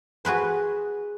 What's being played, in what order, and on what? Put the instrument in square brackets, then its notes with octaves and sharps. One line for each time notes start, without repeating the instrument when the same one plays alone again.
[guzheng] F#4 G#4 B4 C5